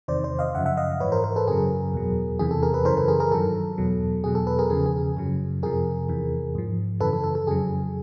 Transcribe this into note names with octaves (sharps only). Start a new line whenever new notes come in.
E2 C3 D#3 C5 D5
C5 D5
D#5 F5
F#2 C#3 F3 E5 F#5
E5 F#5
D#5 F5
G#2 E3 B4 C#5
A#4 C5
A#4 C5
A4 B4
F#2 C#3 F#3 G#4 A#4
E2 B2 F#3
E2 C3 E3 G#4
A4
G#4 A#4
A4 B4
F#2 C#3 E3 A#4 C5
A4 B4
G#4 A#4
G#4 A#4
G2 D#3 F#3 A4
E2 B2 F#3
E2 B2 F#3 G#4
A4
A4 B4
G#4 A#4
E2 C#3 F3 G#4
G#4
F#2 C#3 F#3
F2 C3 F3 G#4 A#4
E2 C3 E3
G#2 F3
F#2 C#3 E3 A4 B4
A4
A4
A4
F2 C#3 F#3 G#4